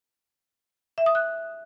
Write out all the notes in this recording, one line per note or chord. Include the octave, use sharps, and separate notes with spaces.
E5
D#6
F#6